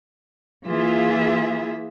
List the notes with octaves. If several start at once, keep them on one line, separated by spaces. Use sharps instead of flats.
E3 A#3 F4 G#4 E5